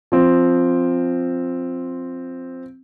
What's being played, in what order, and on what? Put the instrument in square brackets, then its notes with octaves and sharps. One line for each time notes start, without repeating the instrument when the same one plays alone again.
[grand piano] F3 C4